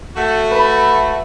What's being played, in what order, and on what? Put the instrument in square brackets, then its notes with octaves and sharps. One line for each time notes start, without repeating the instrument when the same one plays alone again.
[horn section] A3 F#4
[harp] B4 B5